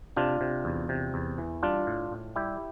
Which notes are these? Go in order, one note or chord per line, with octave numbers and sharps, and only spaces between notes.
C3 D4 F4
C3
E2
C3
E2
E3
G3 D4 F4
A2
A2
G3 E4 G4